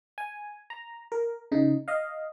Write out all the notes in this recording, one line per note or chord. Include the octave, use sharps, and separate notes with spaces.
G#5
A#5
A#4
C#3 D#4
D#5 F5